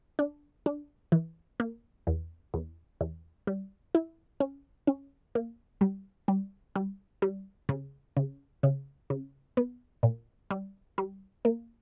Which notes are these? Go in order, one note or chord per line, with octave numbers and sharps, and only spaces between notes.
D4
D4
E3
A#3
E2
E2
E2
G3
E4
C#4
C#4
A#3
G3
G3
G3
G3
C#3
C#3
C#3
C#3
B3
A#2
G3
G3
A#3